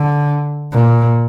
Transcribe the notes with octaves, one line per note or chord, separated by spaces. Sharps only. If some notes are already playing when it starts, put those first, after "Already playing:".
Already playing: D3
A#2